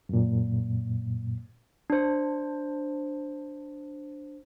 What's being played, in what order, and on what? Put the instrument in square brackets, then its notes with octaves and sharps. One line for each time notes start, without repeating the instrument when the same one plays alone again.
[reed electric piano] F#2 A#2
[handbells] D4 C5